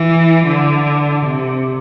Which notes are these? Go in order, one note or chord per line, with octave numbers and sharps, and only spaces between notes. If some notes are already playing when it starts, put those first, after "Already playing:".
Already playing: E3
D3
C3